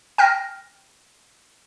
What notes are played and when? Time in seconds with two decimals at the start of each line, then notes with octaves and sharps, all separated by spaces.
0.18 G5 F6 A#6